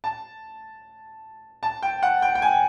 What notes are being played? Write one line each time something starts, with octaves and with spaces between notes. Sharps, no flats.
A5
A5
G5
F#5
G5
G5
G#5